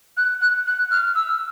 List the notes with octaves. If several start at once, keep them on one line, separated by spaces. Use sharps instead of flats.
F#6
F#6
F#6
F6
E6